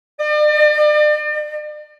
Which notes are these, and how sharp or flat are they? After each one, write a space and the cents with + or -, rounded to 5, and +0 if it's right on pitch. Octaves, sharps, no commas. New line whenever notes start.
D5 +40